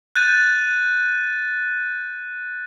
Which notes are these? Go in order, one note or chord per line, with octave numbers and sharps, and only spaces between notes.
F#6 G6 A6 D#7